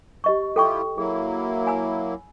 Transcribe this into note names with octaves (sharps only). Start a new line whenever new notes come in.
G4 D#5 C#6
E4 F4 G4 A4 G5 C#6
F#3 A#3 E4 G#4
G#5 B5 E6